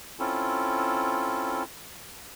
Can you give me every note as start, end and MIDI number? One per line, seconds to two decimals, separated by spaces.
0.19 1.63 60
0.19 1.63 61
0.19 1.63 64
0.19 1.63 65
0.19 1.63 69